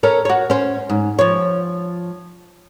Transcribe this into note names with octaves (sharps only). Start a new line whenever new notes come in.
C#4 A4 A#4
F#4 C#5
C#4 C5
G#2
F3 C#5